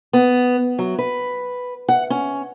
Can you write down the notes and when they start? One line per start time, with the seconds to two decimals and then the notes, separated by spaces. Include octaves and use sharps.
0.13 B3
0.79 F#3
0.98 B4
1.88 F#5
2.10 C#4